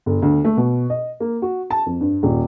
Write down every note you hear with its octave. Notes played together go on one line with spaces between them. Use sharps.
G1
D2
A3
B2
D#5
A#3
F#4
A5
F2
G2
D#1